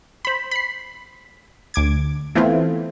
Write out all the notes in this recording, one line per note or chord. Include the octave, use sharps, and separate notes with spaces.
C5 B5
B5 C7
D2 D6 G#6
E3 A3 B3 C4 E4 F4